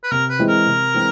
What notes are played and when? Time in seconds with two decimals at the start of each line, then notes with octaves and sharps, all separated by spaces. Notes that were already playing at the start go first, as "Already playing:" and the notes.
0.04 B4
0.12 C3 A#4
0.30 B4
0.39 E3 G#3 C4 E4
0.49 A#4
0.67 C3
0.94 E3 G#3 C4